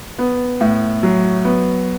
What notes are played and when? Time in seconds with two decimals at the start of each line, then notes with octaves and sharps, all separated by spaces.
0.19 B3
0.61 A2
1.03 F#3
1.45 B3